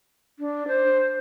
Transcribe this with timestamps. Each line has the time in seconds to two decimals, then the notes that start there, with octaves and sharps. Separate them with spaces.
0.39 D4
0.68 C5